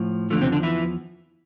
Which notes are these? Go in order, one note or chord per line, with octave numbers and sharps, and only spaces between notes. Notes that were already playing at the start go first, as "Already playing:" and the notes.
Already playing: A2 F3
E2 D3 F3 A3
C3 C4
D3 D4
E3 E4